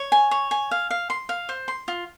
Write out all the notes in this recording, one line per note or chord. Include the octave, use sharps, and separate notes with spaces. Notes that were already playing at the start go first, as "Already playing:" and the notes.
Already playing: C#5
G#5
C#5
G#5
F5
F5
C6
F5
C5
C6
F4